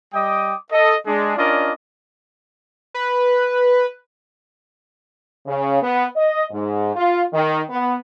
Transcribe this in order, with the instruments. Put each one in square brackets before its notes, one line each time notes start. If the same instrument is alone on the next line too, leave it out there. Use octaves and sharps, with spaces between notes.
[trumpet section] G3 D#5 G5 D6 D#6
A4 D#5
G#3 D4
C#4 D4 F4 A#4 D5 D#5
[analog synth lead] B4
[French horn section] C#3
B3
D#5
G#2
F4
D#3
B3